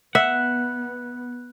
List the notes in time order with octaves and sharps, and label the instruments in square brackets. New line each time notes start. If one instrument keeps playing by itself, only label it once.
[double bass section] B3 [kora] E5 [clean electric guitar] F#5 [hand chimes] F#6